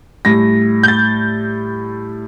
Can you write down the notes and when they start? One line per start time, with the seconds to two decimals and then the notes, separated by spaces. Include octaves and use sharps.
0.25 A2 G3 A#6
0.83 G6
0.88 A6